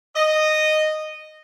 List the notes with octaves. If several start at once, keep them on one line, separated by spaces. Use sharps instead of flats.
D#5